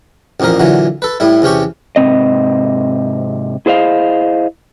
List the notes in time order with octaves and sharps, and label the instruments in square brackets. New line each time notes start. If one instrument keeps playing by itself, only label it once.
[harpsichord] A1 F2 A#2 F3 A#4
A#2 D3 E3 F#3
A4 B4
A2 G3 E4
E2 C3 C#4 G4 C#6
[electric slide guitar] G#2 C3 C4 D#5
E4 G#4 C5 D#5 F5